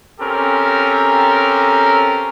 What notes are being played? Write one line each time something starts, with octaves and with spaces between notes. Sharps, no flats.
C4 C#4 G4 A4 A#4